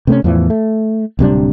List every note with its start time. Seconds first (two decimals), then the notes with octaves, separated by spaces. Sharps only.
0.07 C3 A3 B3 C#4
0.24 E2 A2 E3 F3
0.50 A3
1.19 D1 C3 G3 D4